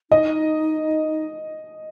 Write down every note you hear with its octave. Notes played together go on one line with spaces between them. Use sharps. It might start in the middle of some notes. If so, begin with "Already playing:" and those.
D#4 D#5